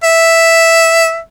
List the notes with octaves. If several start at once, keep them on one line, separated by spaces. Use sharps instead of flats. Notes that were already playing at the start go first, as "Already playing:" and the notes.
E5